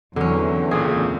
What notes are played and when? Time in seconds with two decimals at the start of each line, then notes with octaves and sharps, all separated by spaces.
0.16 E2 D3 F#3 C4 C#4
0.71 C#2 A#2 D3 G#4